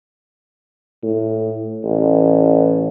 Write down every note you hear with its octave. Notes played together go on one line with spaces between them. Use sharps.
A2
A1